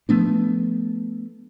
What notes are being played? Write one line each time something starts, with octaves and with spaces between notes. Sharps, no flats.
F3 A3 B3 D4